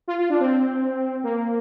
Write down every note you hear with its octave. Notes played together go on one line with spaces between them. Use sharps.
F4
F4
D4
C4
A#3